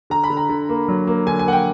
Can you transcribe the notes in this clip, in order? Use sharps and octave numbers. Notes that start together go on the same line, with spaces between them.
D3 A#5
B5
D3
A#5
D3
A#3
F#3
A#3
D3 G#5
G#5
A#3 F#5
G5